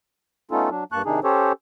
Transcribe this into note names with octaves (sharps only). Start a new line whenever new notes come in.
A3 B3 C#4 D#4 F4 A4
F#3 D4
G2 A#3 A5 C#6 F#6
C3 D#3 D4 D#4 G#4
C#4 G4 A4 C5 C#5